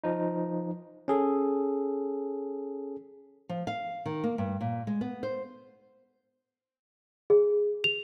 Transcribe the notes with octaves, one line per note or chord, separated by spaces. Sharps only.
F3 D#4
C#4 G#4 A4
F3
F5
D#3
A#3
G2
A#2
G#3
B3
C5
G#4
F7